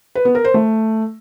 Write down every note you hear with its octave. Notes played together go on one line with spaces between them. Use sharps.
B4
B3
A#4
C5
A3